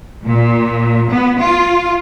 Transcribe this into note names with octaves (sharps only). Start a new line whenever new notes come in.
A#2
B3
F4